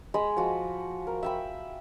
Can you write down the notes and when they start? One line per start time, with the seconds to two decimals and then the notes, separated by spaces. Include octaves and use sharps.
0.14 G#3 D#5 B5
0.37 F3 F#4
1.07 A#4
1.23 E5 G5 B5